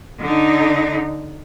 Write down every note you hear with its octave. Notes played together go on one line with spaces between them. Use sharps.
D3 D#4